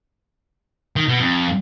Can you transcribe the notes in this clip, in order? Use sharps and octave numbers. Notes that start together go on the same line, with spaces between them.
D#3
B2
F2